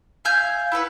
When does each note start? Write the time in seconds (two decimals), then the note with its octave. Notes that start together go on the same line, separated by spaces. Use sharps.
0.25 E5 F5 G#5 G6
0.72 E4 A4 B4 F#5